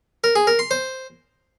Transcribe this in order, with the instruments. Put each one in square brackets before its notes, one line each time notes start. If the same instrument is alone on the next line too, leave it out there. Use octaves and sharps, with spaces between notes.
[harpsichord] A#4
G#4
A#4
C6
C5